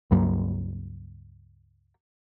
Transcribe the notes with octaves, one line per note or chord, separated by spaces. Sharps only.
C#2 G2 F#3 A#3